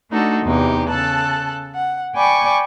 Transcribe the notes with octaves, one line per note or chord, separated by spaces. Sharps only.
A3 D4 D#4 F#4 A4
E2 C3 D#4 G4
C#3 A4 A5 F#6
F#5
D5 G5 G#5 B5 C#6 D6